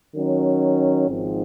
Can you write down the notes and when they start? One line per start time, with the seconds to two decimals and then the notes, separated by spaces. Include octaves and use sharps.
0.14 D#3 F#3 C#4
1.08 G#1 G#2 F3 C4